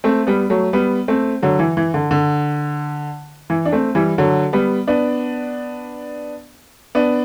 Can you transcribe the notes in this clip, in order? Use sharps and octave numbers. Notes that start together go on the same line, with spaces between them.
A3 C4
G3 B3
F#3 A3
G3 B3
A3 C4
D3 F#3
E3
E3
D3
D3
E3
D4
A3 C4
E3 G3
D3 F#3
G3 B3
B3 D4
B3 D4